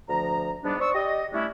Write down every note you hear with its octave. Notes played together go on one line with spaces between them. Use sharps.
D2 F3 A#5
G#2 G3 B3 D4
C5 D5 C#6 D#6 E6
G4 D5 D#5
G3 A3 C#4 D4 E4